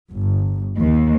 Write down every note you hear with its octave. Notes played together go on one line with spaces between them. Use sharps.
G1
D#2